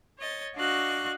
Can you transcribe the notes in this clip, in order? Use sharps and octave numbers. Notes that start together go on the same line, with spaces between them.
C#5 D#5 A6
D4 F#4 D#5 F5 C#6 F#6